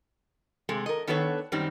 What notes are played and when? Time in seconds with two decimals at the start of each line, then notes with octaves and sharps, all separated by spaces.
0.69 C3 G#3 A3
0.86 A#4 D#5
1.07 D#3 B3 D4 A4 B4 C#5
1.52 F#2 D#3 G3 C4 D#4